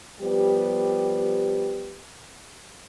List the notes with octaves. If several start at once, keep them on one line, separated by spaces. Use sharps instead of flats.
F3 G3 B3 G4